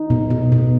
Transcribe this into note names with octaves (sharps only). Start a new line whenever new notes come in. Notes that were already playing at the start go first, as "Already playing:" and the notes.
Already playing: D#4
B2
B2
B2